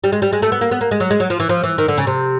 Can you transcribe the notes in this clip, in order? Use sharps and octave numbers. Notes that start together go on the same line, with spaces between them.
G3
G#3
G3
G#3
A3
B3
A#3
B3
A#3
G#3
F#3
G#3
F#3
F3
E3
F3
E3
D#3
D3
C#3
C3